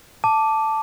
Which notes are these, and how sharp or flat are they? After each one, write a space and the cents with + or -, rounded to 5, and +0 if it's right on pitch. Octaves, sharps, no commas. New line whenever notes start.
A5 +0 D6 -5